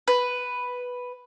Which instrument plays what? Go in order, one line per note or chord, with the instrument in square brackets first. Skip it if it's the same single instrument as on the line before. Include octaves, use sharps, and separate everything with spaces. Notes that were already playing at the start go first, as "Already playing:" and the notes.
[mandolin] B4